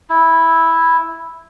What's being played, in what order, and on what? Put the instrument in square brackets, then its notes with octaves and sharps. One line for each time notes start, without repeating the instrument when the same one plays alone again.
[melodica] E4